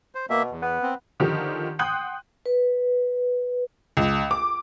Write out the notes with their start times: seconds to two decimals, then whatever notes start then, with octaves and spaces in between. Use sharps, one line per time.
0.15 C5
0.30 B2 A#3 E5
0.51 E2
0.62 B3
0.82 C4
1.20 D3 D#3 F3 G4
1.79 F#5 G5 C6 D#6 F#6 G6
2.46 B4
3.97 C#2
4.31 D6